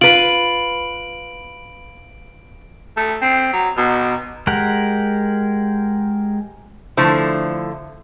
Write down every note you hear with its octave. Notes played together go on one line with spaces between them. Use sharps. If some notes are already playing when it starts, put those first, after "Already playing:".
F4 B4 D7 F#7
A3
C4
F#3
B2
G#3 G4 A#4 F#5
D3 F3 A3 E4 C5 A5